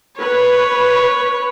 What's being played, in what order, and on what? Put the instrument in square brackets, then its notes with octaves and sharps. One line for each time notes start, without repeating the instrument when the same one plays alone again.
[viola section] B4 [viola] C#5